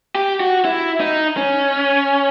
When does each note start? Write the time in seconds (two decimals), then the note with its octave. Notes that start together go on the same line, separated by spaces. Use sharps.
0.15 G4
0.40 F#4
0.65 E4
1.00 D#4
1.37 C#4